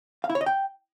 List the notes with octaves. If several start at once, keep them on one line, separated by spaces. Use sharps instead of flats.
F5
E4
C#5
D#5
G5